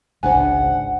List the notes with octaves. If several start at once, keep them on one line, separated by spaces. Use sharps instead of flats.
G#1 C#2 D4 C5 F#5 G#5